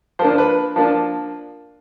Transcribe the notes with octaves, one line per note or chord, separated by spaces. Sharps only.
F3 A#3 D4 C5
B4
F3 A#3 D4